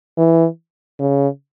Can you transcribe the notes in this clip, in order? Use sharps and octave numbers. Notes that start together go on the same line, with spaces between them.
E3
C#3